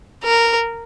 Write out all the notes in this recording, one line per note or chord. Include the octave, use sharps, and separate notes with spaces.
A#4